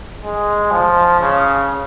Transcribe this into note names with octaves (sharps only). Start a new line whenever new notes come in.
G#3
F3
C#3